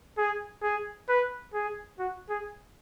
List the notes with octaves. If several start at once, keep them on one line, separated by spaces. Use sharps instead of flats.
G#4
G#4
B4
G#4
F#4
G#4